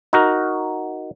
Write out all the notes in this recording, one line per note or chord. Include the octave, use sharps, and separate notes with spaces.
D#4 F#4 A#4